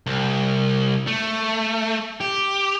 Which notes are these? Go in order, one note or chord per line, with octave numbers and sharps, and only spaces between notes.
C2
A3
G4